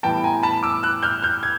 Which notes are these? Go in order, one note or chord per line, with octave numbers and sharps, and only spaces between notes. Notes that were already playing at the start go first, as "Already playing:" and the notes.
A2 E3 G3 B3 G5 A5
G#5 A#5
A5 B5
D6 E6
E6 F#6
F6 G6
F6 G6
G#6